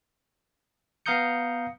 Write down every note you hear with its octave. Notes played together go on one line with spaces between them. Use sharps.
B3 F5 A#5 D#6 G6 C#7